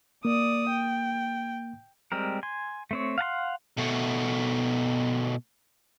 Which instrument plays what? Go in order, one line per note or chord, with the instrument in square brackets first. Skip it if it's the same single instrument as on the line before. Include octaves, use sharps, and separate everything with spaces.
[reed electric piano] A#3 [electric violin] D5 D#6
[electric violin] G5
[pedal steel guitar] G3 G#3 C4 A#4
G#5 C6
A3 C4 C#5
F5 F#5 A5 C6
[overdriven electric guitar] B2 A3